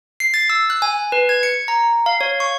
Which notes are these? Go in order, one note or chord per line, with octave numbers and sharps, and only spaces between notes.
C7
A6
E6
F#6
G#5
B4
G#6
C#7
A#5
F5
C#5
C#6